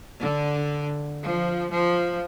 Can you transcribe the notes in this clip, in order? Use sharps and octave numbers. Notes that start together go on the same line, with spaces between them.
D3
F3
F3